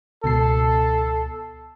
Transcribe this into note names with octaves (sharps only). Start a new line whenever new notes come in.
C#2 B2 A4 C7